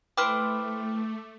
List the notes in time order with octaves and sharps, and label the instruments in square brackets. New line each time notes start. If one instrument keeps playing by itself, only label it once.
[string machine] A3 [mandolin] E4 B4 C5 [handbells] G5 F6 [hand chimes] D6